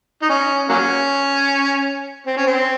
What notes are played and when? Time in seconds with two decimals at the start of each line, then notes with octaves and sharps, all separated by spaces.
0.22 D#4
0.30 C#4
0.69 F#3 A#3 C#4
2.26 C4
2.37 C#4
2.47 C4